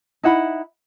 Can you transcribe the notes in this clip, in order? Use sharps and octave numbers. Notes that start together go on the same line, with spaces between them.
D#4 E4 F#5 B5